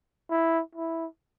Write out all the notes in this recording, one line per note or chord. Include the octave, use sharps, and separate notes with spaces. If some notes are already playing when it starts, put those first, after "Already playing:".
E4
E4